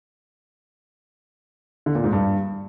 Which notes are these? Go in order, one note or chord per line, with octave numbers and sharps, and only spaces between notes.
D3
A#2
G#2
G2